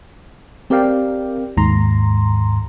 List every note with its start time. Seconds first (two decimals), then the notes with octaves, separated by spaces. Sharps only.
0.70 C4 G4 A#4 D5 F5 G5
1.57 D#2 G#2 A#5 C6